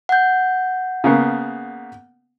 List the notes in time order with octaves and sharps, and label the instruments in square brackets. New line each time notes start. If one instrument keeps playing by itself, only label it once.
[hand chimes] F#5 G6
[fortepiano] C#3 A#3 B3